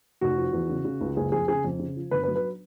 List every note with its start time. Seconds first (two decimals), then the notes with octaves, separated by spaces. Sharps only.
0.21 F1 F#4
0.37 F3
0.53 E2
0.69 C#3
0.85 C#3
1.01 C#2
1.16 F#1 G#4
1.32 F2 G#4
1.48 C#3 G#4
1.64 F2
1.79 C#3
1.96 F3
2.11 G1 B4
2.24 B4
2.28 F#3
2.36 B4